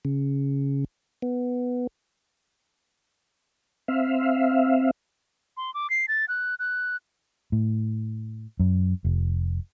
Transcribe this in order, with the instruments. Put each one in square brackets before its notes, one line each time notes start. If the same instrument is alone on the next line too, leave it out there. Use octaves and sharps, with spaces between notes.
[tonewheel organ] C#3
B3
C4 E5 F5
[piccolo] C6
D6
C7
A6
F#6
F#6
[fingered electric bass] A2
F#2
F1